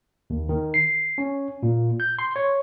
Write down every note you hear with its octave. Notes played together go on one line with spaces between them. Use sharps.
D#2
D#3
C7
C#4
A#2
G6
C6
C#5